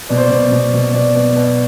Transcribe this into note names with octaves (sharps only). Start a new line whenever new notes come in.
B2 D5
C5
D5
B2
B2
B2
B2 D5
B2
B2